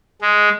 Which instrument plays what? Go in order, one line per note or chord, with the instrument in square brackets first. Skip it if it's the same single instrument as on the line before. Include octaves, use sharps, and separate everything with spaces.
[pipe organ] G#3